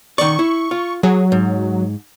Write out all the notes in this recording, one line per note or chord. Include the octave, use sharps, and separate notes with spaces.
D#3 D5 C#6
E4
F4
F#3 G#4
G#2